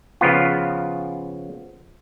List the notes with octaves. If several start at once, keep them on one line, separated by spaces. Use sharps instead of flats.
C#3 F3 B3 F4